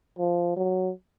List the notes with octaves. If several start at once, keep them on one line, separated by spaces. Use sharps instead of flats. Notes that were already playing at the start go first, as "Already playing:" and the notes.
F3
F#3